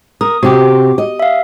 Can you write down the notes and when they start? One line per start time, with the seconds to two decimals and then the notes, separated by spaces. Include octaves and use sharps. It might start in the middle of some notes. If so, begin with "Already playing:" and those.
0.21 A#4 D#6
0.43 C3 F#4 G4 D6
0.98 D#5
1.20 E5 F5